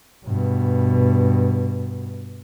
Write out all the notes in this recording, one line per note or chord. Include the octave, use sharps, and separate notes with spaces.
G2 B2